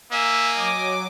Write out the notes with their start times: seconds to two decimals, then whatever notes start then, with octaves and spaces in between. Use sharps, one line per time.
0.12 A#3 E5 G#5
0.56 F#3 D#5 D6